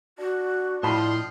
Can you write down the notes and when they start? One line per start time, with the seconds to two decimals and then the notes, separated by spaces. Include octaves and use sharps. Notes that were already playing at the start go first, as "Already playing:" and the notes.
0.19 D4 F#4
0.83 A2 F3 D#5 A5 B5 C6